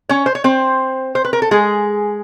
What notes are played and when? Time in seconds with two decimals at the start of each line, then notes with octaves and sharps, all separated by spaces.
0.09 C#4 C#5
0.26 C5
0.35 C#5
0.44 C4 C5
1.15 C5
1.25 B4
1.33 A#4
1.42 A4
1.51 G#3 G#4